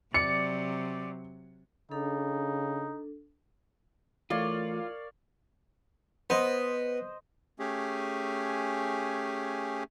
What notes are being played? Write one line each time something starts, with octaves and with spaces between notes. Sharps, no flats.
C3 F#3 D5 C#7
C#3 D4 D#4 A4
E3 A3 F4 A#4 C#5 D5 F5
B3 C5 D#5 C6
A3 C#4 G4 G#4